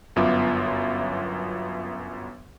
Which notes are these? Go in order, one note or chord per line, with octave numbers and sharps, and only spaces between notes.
G1 F#2 B3 F4 E5 D6